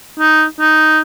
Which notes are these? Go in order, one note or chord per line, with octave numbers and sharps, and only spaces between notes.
D#4
D#4